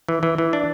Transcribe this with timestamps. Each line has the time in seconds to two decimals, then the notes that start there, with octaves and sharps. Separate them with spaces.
0.09 E3
0.23 E3
0.38 E3
0.53 D4